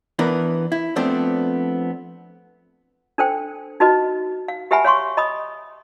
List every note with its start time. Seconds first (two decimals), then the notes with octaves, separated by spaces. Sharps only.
0.19 E3 B3 D4 A#4
0.72 E4
0.96 F3 A3 B3 C4 D4
3.18 D4 A4 C5 G5
3.80 D#4 F#4 B4 D#5
4.48 F5
4.71 G4 B4 E5 F#5 G#5 B5
4.85 C#5 F5 C6 C#6
5.17 D#5 B5 D#6